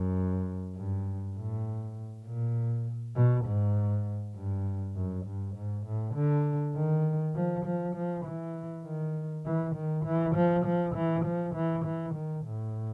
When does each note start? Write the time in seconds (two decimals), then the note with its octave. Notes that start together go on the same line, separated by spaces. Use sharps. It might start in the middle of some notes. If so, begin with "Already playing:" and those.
Already playing: F#2
0.76 G2
1.36 A2
2.26 A#2
3.16 B2
3.45 G#2
4.36 G2
4.95 F#2
5.26 G2
5.55 G#2
5.86 A2
6.15 D3
6.76 D#3
7.35 F3
7.65 F3
7.96 F3
8.25 E3
8.86 D#3
9.45 E3
9.75 D#3
10.05 E3
10.35 F3
10.65 F3
10.95 E3
11.25 F3
11.55 E3
11.85 E3
12.14 D#3
12.45 A2